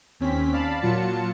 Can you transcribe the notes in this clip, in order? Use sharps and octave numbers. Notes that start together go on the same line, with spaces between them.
D#2 C4 C#4 B6
D5 F5 A5 B5
A#2 F#3 F4 A5 C#7